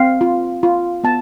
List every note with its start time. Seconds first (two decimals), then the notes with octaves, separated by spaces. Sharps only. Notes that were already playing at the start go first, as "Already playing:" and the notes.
Already playing: C4 F5
0.21 F4
0.63 F4
1.04 B3 A5